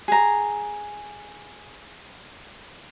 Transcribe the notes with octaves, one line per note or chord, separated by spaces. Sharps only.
G#4 A#5